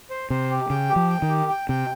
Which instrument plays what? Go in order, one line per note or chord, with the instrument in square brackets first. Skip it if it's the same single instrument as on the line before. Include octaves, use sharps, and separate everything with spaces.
[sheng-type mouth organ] C5
[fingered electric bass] C3 [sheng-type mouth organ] C5
[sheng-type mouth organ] G4
[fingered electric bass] C#3 [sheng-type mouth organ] G5
[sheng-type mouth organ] G4
[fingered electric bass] F3
[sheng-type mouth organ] G5
[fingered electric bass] D#3
[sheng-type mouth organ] G4
G5
[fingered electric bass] C3 [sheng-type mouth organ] G5